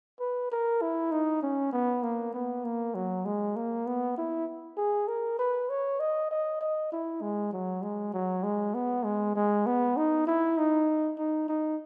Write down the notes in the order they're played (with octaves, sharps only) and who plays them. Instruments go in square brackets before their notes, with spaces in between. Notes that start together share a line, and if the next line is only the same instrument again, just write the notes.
[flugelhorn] B4
A#4
E4
D#4
C#4
B3
A#3
B3
A#3
F#3
G#3
A#3
B3
E4
G#4
A#4
B4
C#5
D#5
D#5
D#5
E4
G#3
F#3
G#3
F#3
G#3
B3
G#3
G#3
B3
D#4
E4
D#4
D#4
D#4